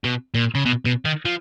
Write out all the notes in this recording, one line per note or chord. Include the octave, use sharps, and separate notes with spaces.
B2
A#2
C#3
B2
B2
D#3
F3